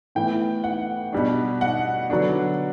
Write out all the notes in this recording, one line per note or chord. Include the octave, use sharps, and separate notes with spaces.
A2 E3 B3 G5
F#5
B2 G3 D4
F#5
D3 F#3 B3 D4